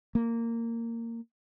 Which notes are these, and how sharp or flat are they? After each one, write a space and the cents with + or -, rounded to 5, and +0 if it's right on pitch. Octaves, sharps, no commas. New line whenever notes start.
A#3 -15